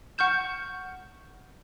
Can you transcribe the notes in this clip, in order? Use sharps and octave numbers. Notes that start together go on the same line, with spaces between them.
F#5 C#6 F6 G6 E7